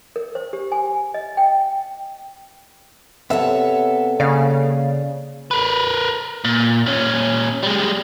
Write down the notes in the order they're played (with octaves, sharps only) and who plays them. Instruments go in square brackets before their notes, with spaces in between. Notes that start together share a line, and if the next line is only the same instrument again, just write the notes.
[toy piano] A#4
C5
G4
G#5
D#5
G5
[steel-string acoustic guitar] C3 A4 C#5 [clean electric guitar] B3 E5 [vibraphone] C4 F#5
[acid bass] C#3 [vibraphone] A#3 [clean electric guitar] D5 F5
[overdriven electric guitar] A#4 B4
A#2
A#2 C#4
G3 G#3